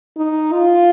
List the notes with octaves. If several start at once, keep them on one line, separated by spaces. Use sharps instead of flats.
D#4
F4